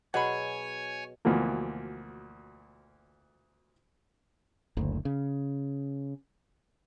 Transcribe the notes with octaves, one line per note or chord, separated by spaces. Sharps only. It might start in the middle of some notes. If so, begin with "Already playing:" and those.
B2 F#3 G#4 C#5 F#5 G#5 B5
D2 B2 E3 F3 A#3
F#1 D2
C#3